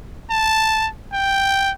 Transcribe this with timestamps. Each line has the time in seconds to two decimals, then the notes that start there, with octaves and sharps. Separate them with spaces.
0.30 A5
1.13 G5